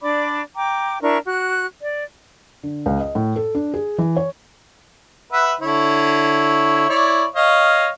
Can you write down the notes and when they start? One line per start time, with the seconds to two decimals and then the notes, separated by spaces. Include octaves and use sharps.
0.01 D4 D5 B5 D6
0.55 G5 A#5 D6
1.01 D4 E4 A#4 C#6
1.26 F#4 F#6
1.81 D5
2.63 D3
2.86 C#2
3.00 D#5
3.15 A2
3.36 A4
3.55 D4
3.74 G#4
3.98 E3
4.16 C#5
5.32 B4 E5 F#5
5.61 D3 E4 C#5
6.89 E4 C#5 D5
7.35 C#5 D#5 F5